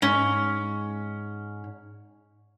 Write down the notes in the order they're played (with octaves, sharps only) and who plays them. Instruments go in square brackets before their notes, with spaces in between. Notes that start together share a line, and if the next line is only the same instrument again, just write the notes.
[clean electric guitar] G#2 [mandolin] C#4